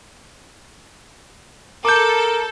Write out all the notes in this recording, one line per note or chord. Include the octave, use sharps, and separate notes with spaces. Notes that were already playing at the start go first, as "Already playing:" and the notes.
A4 A#4 D6 G6